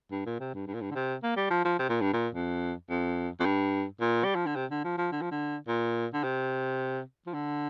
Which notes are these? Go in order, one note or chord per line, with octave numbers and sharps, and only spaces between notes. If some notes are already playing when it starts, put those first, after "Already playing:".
G2
A#2
C3
G2
G2
A#2
G2
D3
C3
A#3
G3
F3
F3
C3
A#2
G2
A#2
F2
F2
F2
G2
A#2
G3
F3
D3
C3
D3
F3
F3
D3
F3
D3
A#2
D3
C3
F3
D3